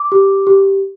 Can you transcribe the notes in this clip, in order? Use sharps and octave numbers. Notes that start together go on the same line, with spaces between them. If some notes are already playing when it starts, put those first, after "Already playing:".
Already playing: D6
G4
G4